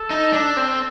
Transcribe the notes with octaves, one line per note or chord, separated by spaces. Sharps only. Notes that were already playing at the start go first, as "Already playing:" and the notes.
Already playing: A4
D#4
D4
C4